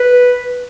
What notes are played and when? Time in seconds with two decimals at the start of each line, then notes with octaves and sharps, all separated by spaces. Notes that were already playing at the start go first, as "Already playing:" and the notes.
Already playing: B4